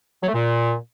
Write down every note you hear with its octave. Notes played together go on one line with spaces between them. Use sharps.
F#3
A3
A#2